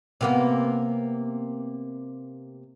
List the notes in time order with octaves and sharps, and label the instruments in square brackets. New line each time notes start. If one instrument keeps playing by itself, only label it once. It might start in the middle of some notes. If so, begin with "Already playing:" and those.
[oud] C3 A#3 B3